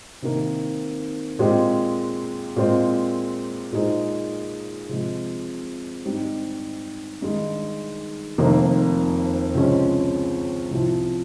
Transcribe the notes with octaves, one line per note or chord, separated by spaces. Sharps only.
C3 D#3 A#3
A#2 G#3 C4 G4 C5
A#2 G#3 C4
A#2 G#3 D#4 G#4 C5
C3 F3 G#3
G#2 G3 C4 D#4
G2 D#3 G#3 D#4
F1 F2 C3 D#3 A#3
C#2 C3 F3 G#3 C#4
C2 C3 F3